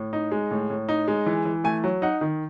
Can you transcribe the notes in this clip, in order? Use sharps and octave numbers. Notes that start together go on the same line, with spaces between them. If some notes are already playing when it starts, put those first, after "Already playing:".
Already playing: A2
D#4
G#3
A2
A2
D#4
G#3
E3
E3
A3 G#5
F#3
D#4 F#5
D#3